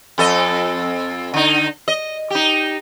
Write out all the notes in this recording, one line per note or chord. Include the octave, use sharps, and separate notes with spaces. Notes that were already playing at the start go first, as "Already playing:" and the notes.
F2 A4 D#5
D3 D#4
D#5
D#4 G4